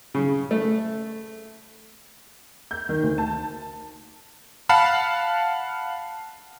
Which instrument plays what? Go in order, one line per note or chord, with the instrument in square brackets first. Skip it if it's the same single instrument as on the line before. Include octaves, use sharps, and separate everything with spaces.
[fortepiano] C#3
A3
[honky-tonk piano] G6
D#3
D2
A5
[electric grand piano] F5 F#5 A5 B5